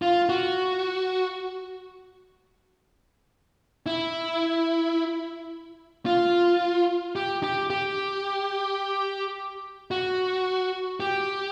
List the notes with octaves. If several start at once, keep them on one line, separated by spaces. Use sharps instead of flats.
F4
F#4
E4
F4
G4
G4
G4
F#4
G4